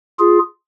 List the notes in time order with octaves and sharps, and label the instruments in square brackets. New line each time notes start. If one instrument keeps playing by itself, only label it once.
[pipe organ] F4 G#4